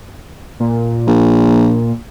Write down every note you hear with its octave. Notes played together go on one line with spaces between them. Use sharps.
A#2
A#1